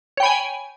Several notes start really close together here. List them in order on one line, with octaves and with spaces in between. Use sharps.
C#5 G5 B5 G#5